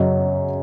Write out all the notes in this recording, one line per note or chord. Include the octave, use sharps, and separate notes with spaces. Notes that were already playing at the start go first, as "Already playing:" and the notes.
Already playing: F#2 C#3 F#3 D#5